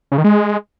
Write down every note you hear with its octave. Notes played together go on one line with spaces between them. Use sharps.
C#3
D#3
G#3